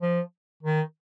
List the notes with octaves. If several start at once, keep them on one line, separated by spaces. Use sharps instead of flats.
F3
D#3